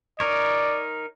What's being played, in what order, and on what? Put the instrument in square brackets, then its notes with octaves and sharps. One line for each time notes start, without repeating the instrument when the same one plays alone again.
[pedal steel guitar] D#4 A#4 C#5 [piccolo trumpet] D5